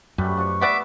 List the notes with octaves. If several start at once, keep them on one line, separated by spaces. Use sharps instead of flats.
F#2 G3 A3 B4
F3 D4 C#6
B3 D5 E5 F#5 C#6 D6